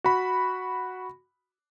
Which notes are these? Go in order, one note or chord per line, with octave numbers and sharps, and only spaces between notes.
F#4 B5